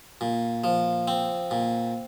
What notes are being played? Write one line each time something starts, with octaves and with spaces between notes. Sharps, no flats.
A#2
F3
C4
A#2